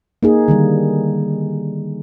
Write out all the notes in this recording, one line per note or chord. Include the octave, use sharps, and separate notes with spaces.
A#3 D#4 G#4
D3 D#3 G3